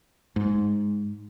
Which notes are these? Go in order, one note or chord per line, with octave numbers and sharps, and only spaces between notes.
G#2